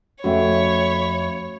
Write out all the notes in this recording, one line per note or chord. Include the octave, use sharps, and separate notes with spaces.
F2 A3 C#4 F#4 C#5 E5 G5 B5